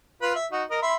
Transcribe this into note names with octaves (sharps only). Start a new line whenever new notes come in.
F4 B4
E5
D#4 F#4
A#4 D#5
E5 B5 C6